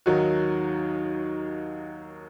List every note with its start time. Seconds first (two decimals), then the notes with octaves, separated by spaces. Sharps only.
0.06 D#2 D#3 F#3 D#4 F#4